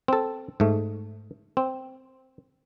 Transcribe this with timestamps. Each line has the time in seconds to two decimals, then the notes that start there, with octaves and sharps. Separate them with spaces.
0.08 C4 A4
0.60 G#2 A3
1.57 C4